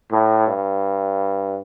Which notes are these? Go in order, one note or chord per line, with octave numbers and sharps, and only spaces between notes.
A2
G2